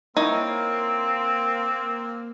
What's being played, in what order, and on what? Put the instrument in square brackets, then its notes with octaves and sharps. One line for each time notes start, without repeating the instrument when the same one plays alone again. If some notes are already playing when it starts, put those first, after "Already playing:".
[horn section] A#3 [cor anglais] C4 [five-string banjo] D#4 E4 C#5